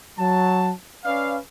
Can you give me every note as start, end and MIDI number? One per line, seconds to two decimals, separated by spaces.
0.18 0.71 54
0.18 0.71 81
1.05 1.36 61
1.05 1.36 71
1.05 1.36 74
1.05 1.36 77